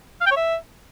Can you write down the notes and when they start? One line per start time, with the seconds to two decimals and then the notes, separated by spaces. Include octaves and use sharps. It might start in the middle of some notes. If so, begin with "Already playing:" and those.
0.21 F5
0.26 G5
0.31 C#5
0.36 E5